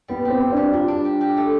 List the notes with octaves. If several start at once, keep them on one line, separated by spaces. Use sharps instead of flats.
G3 B3
C4 G4
G3
G3 D4
D4 F4
D4
G4
G4
A3